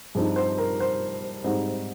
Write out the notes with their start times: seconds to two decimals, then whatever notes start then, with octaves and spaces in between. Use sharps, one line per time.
0.15 G2 F3 C4 D#4 G#4
0.36 C5
0.58 A#4
0.80 C5
1.44 G#2 G3 C4 D#4